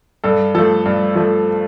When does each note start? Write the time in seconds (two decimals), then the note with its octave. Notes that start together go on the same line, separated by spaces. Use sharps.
0.24 G2 A4
0.55 F3 A3 A4
0.86 G2
1.15 F3 A3